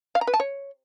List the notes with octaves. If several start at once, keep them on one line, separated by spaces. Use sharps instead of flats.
F5
A#5
B4
A5
C#5